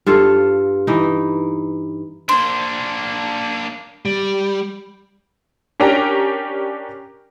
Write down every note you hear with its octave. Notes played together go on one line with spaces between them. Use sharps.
G2 F4 A4
E3 D#4
A#3 D4 C5
G3
C#4 D4 G4 A#4 G5 A#5